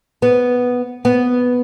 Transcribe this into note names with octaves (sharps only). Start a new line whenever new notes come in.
B3
B3